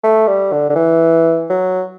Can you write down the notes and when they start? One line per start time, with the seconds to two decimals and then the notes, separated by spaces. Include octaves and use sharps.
0.04 A3
0.27 G3
0.52 D3
0.70 D3
0.76 E3
1.50 F#3